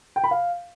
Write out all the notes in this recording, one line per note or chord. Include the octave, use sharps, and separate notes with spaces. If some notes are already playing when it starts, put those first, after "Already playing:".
G5
B5
F5